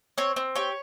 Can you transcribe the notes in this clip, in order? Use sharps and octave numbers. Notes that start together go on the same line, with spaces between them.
C4 C#5
C4
G4 C#5